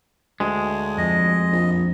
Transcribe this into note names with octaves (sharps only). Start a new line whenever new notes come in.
D2 G#3
F2 D#5
A#1